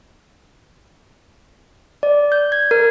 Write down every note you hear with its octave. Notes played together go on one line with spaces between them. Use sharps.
D5
G6
G#6
A#4